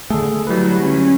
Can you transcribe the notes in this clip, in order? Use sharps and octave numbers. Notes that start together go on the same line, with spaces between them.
D3 A3 G#4 A4
F#3 G3 E4 B4
C#4